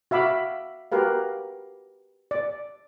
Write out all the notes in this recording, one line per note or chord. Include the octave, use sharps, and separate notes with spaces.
F#4 E5 F5 B5 D6
F#4 G4 A#4 B4 F5
D5